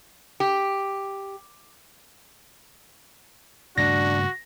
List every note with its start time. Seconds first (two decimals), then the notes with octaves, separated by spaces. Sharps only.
0.40 G4
3.78 G2 C#3 A3 D4 F#4 A#6